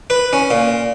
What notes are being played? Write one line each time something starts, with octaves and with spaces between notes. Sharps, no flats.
B4
C#4
A#2